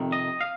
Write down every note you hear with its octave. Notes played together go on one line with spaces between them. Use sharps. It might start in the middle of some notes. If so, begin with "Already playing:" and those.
Already playing: F2 C3 D#3
D#5
F5